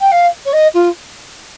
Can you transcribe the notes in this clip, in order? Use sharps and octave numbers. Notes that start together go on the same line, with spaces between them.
G5
F5
C#5
D#5
F4